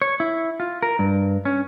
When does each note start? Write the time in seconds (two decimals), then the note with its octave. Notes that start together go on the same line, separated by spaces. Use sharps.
0.02 C#5
0.20 E4
0.60 F4
0.83 A#4
0.99 G2
1.45 C#4